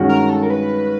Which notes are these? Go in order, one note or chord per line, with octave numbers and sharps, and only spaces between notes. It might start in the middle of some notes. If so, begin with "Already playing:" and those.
Already playing: G2 D#3 G#3 C#4 F#4
A#4
A4
A#4
B4